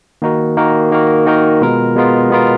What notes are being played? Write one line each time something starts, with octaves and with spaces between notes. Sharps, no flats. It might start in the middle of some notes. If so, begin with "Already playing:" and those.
D#3 A#3 D#4 F#4 A#4
D#3 A#3 D#4 F#4 A#4
D#3 A#3 D#4 F#4 A#4
D#3 A#3 D#4 F#4 A#4
B2 G#3 B3 F4 A#4
B2 G#3 B3 F4 A#4
B2 G#3 B3 F4 A#4